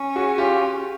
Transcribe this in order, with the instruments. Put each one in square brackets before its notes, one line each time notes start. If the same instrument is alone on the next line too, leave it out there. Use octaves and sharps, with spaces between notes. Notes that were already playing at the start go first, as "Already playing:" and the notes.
Already playing: [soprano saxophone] C#4
[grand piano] F#4 G#4
F4 G4